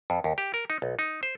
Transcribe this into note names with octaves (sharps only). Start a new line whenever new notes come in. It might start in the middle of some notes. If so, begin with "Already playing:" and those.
F2
D#2
G4
A#4
D#4
B1
D#4
C5